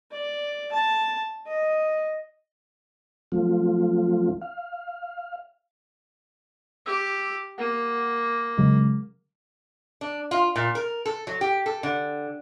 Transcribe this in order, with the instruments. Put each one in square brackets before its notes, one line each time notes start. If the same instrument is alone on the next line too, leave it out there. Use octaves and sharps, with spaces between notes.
[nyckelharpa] D5
A5
D#5
[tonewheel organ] F3 F#3 A3 C4 F4
F5
[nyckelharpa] G4 [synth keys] E6
[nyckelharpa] A#3 [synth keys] F#5 D#7
[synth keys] C#3 F#3 G#3
[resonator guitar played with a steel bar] D4
F4
A#2
A#4
A4
F#3
G4
A4
D3